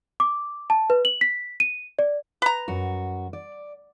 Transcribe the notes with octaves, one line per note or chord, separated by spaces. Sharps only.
D6
A5
B4
F#7
B6
D#7
D5
B4 A#5
F#2 F#4
D5